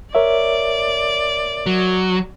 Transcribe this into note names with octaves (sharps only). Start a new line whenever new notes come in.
A#4 C#5 D5 E5
F#3